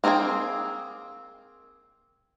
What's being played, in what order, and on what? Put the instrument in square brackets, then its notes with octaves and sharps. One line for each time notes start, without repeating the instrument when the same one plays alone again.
[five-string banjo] A#3 C4 D4 G#4 G5